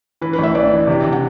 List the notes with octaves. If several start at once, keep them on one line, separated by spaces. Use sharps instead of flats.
E3 B4
B4
A1 E5
A1 D5
E3
C3
C3
F#5